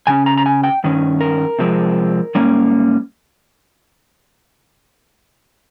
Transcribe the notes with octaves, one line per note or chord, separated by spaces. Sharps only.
C#3 G#3 C#4 G#5
A#5
A#5
G#5
G5
G2 D#3 C#4
A#4
C3 F3 G#3 C4
G#2 G3 A#3 C#4